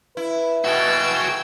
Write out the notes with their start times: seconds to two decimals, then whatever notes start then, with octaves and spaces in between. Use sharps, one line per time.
0.17 E4 B4
0.65 B2 F#4 G#4 G5 E6